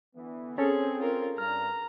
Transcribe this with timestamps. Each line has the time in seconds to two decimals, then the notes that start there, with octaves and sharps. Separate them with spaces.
0.15 D3 E3 B3
0.58 C4 C#4 G#4 A4 C#5
0.99 F4 A#4
1.38 G2 A#5 F6